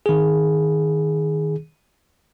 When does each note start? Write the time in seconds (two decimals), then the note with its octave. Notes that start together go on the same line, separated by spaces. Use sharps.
0.06 D#3 G#4